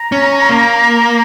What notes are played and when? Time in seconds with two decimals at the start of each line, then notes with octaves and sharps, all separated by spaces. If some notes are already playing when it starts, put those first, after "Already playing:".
Already playing: A#5
0.12 C#4
0.49 A#3